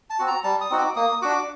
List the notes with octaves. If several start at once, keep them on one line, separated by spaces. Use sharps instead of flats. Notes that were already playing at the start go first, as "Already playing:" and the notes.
A5
C4 F#4
A#5
G3 A5
D#6
C4 D#4 F#4
D6
A#3 D#6
D4 F#4 D6